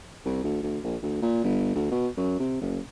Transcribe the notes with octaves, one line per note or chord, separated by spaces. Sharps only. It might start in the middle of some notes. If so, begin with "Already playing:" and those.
C2
D2
D2
A#1
D2
A#2
G1
D2
B2
F#2
C3
F#1